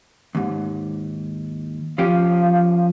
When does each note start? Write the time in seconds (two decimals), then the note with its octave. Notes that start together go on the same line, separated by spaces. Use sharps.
0.35 D#2 G#2
1.98 F3 C#4 G4 F5